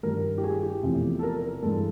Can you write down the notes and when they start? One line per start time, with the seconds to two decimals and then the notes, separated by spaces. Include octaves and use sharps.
0.03 G2 D#3 G3 A#4
0.38 G4
0.44 G#4
0.63 G4
0.83 E2 C3 F3 A3
1.19 A4
1.23 A#4
1.43 A#4
1.62 G2 E3 G#3 A4